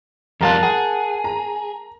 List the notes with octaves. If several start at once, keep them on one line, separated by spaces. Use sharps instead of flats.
F2 G3 F4 A#4 F5 A5 A#5 F#6
G#4 F#5
A#5